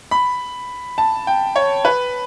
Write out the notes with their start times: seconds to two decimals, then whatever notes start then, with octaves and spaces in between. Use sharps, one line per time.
0.11 B5
0.98 A5
1.27 G5
1.56 C#5
1.85 B4